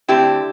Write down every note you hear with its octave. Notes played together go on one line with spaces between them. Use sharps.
D3 A3 C4 E4 G4